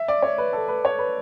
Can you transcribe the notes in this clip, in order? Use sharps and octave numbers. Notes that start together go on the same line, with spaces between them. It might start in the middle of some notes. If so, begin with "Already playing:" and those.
Already playing: E5
D5
C#5
B4
A4
B4
C#5
B4